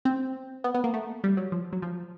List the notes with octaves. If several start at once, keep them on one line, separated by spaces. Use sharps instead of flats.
C4
B3
B3
A#3
A3
G3
F#3
F3
F#3
F3